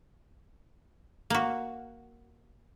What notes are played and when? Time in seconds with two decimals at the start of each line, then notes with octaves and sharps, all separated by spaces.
1.30 A#3 F#4